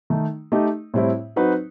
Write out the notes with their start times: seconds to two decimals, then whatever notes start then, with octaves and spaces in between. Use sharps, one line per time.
0.10 D#3 A3 D#4
0.52 A3 D#4 G4 D#5
0.94 A2 G3 C4 E4
1.36 F#3 C4 D#4 F#4 B4